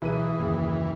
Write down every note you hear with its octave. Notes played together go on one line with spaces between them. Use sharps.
B1 E3 G#4 B4 D#7
F#1 D#2